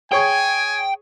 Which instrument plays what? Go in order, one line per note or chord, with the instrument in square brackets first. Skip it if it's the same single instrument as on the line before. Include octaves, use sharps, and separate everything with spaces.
[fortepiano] G#4 C#5 C#6 [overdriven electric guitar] G5 [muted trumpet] G#5